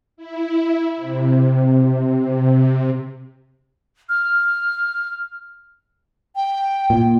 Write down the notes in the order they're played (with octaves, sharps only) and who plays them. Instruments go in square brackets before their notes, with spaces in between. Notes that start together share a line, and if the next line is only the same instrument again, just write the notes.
[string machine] E4
C3
[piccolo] F6
[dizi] G5
[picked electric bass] A#2